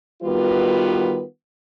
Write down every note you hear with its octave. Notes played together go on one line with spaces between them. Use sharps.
D#3 G3 B3 F4 F#4 B4